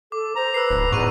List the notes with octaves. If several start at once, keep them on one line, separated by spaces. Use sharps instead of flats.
A4 D6
C5 A#5
B4 E6 C7
D1
E2 G#2 C#6 D#7